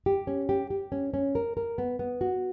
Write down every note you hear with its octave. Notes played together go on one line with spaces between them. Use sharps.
G4
C#4
G4
G4
C#4
C#4
A#4
A#4
B3
B3
F#4